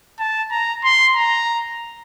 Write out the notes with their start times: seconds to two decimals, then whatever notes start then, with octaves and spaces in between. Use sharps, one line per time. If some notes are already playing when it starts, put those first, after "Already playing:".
0.19 A5
0.51 A#5
0.84 C6
1.16 A#5